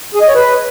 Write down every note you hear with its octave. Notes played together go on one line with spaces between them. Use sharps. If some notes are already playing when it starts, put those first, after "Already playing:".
G#4
D#5
C#5
B4